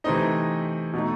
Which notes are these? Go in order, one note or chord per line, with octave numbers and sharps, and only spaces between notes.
C3 E3 A3 C4 D#4 D#5
B2 A3 D#4